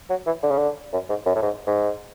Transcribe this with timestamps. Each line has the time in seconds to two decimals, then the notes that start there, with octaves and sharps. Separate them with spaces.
0.10 F#3
0.26 E3
0.43 D3
0.51 C#3
0.58 D3
0.93 F#2
1.10 G#2
1.26 F#2
1.35 A2
1.42 G#2
1.67 G#2